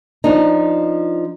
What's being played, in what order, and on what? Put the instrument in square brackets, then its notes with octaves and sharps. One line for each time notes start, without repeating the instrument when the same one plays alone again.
[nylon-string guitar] F3 D4 D#4